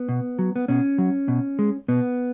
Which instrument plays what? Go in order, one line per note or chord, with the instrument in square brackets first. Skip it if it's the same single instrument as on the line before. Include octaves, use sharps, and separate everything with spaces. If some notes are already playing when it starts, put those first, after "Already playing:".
Already playing: [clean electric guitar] B3
B2
F#3
B3
B2 C#4
F#3
B2
G#3
B2 B3